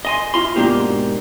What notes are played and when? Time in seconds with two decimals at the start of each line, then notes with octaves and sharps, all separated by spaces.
0.05 D#5 G#5 C6
0.34 E4 F4 C6
0.56 G#2 B2 A3 A#3 D4 G4